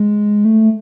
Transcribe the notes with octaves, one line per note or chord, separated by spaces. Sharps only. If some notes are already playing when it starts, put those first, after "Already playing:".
Already playing: G#3
A3